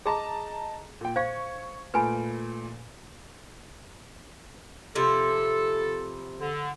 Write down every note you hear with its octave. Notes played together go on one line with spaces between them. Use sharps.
G#4 D#5 A5 A#5
A#2 G5
C5 F5 C#6 G#6
A#2 A3 B4 G#5 B5 D7
C3 F3 E4 A4
D3